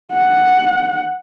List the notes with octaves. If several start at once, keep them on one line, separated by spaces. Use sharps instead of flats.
F#5